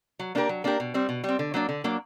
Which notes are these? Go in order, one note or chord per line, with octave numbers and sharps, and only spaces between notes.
F#3
A#3 D4 G4 A#4
F#3
A#3 D4 G4 A#4
B2
G3 C4
B2
G3 C4
D3
F#3 A#3 D4
D3
F#3 A#3 D4